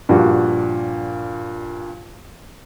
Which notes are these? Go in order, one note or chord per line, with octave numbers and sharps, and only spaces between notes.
G2 A#2 F3 F#4 G4